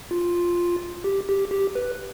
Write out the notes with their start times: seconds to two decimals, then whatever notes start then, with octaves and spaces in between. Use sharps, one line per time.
0.11 F4
1.04 G4
1.29 G4
1.51 G4
1.75 B4